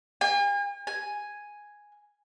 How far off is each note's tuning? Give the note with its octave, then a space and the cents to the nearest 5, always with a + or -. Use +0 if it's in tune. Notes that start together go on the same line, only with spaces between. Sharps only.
G#5 -45
G#5 +0